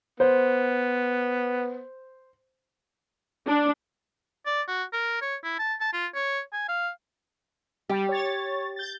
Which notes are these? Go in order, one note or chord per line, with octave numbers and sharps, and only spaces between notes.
B3 C5
D4
D5
F#4
A#4
C#5
E4
A5
A5
F4
C#5
G#5
F5
G3 G4
C#5 A6
G6 A6